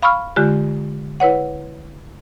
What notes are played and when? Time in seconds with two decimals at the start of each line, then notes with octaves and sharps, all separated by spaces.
0.02 F5 B5 C#6 E6 F6
0.36 D3 G#3 F4 G4
1.20 E4 B4 C#5 F#5